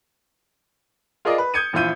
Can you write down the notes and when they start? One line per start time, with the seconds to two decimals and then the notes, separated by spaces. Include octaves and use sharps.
1.25 F4 G#4 A#4 D5 D#5
1.38 B4
1.54 D#6 G6 G#6 C#7 D#7
1.73 A#1 E3 E4 F4 G6 D#7